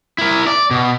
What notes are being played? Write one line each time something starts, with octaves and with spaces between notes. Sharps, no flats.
E4 A#4
D5
B2